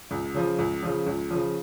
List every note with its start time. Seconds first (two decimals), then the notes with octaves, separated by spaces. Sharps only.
0.11 C#2
0.34 C#3 F3
0.59 C#2
0.83 C#3 F3
1.06 C#2
1.30 C#3 F3